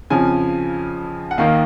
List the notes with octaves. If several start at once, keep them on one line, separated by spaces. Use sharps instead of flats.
F2 C#3 F3 G#5
F#5
D#2 D#3 A#3 F5